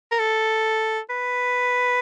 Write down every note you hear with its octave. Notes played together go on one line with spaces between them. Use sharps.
A#4
A4
B4